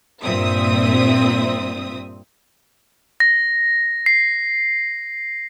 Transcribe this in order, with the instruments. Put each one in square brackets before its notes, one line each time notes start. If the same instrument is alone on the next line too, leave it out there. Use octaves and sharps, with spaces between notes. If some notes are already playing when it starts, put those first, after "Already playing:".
[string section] G2 A#2 C4 E5 D#6
[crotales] A#6
C7